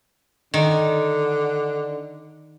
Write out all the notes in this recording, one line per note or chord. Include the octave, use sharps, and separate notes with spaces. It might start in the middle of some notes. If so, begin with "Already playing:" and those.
D3 D#3